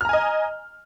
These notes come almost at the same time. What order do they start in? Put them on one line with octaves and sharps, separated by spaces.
F6 A#5 G#5 D#5